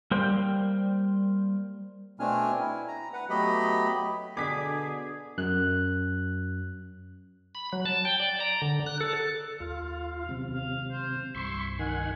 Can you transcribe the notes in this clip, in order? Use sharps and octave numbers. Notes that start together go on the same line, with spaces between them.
G3 A#3 A#4 C5 D5 G5
B2 A3 C4 D4 G#5 F6
E4
A#5
B4 F#5
F#3 A3 B3 G4 D#5 B5
B2 D3 G#4 D6 B6
F#2 F#6
B5
F#3
A5
G5
D5
A#5
D3
F#6
A4
D#2 F4 F5
C3 D#3 F#3 G#3
F5
C5
C2 G2 G3 E4 C6 C#6
D#3 F#5 G#5